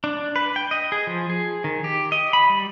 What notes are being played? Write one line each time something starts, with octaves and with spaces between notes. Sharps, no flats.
D4
B4
G5
D#5
G#4
F3
G#4
D#3
G4
D#5
B5
G3